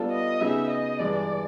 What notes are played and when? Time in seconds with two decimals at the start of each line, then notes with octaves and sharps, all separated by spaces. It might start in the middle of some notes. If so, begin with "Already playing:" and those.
Already playing: G3 B3 D4 F4 A4
0.11 D#5
0.41 C#3 F#3 B3 D#4 G#4 E5
0.71 D#5
1.00 G2 E3 G#3 D5